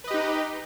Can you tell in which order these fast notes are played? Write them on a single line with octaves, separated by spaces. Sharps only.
B4 D#5 G4 D#4